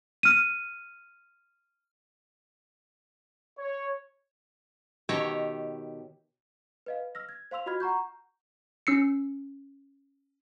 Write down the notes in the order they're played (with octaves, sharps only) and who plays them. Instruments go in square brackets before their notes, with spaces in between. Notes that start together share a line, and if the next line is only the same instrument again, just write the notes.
[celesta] F6 D#7
[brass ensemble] C#5
[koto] B2 D#3 G4 C#5 E5 A#5
[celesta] B4 D#5 F5
E6 F6 A#6
G#6
C5 F5 C6 E6 F7
F4 F#4 D#5 B5 F6 G#6
F#5 A#5 C#6 G6
[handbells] C#4 E6 C7 C#7